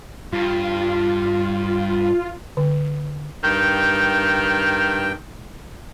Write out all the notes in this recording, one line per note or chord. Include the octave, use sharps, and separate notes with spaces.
G2 F4
D3
G2 D#3 G5